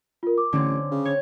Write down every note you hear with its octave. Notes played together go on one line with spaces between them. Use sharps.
F4 A#4
D6
A1 D3 C4 C#4
C#3
C#5